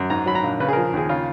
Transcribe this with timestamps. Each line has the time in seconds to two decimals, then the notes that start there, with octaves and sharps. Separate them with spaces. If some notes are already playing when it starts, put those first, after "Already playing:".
Already playing: F#2
0.10 G#2 A#5
0.26 F#3 B5
0.35 A#5
0.43 A#1
0.60 C#3 B4
0.69 G#4
0.73 A#4
0.76 F3
0.93 D#2 G#4
1.09 C#3 F4